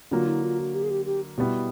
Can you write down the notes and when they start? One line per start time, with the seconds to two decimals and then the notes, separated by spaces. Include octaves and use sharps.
0.11 D3 F#3 A#3 F4
0.27 E4
0.43 F4
0.59 F#4
0.75 G4
0.83 G#4
0.90 G4
1.06 G4
1.38 B2 G3 B3 E4